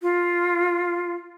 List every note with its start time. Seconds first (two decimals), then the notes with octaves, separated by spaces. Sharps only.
0.02 F4